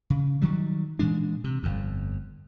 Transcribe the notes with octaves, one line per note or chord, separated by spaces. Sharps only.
C#3
D#3 F#3 G3
A#2 E3 G#3 D4
C3
G1 F2